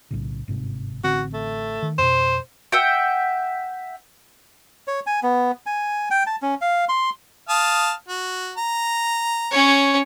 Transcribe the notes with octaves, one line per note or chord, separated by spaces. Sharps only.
B1 A2 C#3
G1 G#2 C3
A1 D3 C4 F#4
A3
D#3
F2 B2 C5
E5 F#5 G5
C#5
G#5
B3
G#5
G5
A5
C#4
F5
C6
F5 A5 D#6
F#4
A#5
C#4 C#5